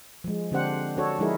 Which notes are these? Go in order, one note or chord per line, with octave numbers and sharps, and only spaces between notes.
F3 G#3
D3 C4 D4 G4 C5 F#5
D4 F#4 A4 C#5
F3 G#3 D#4 E4 G#4 A#4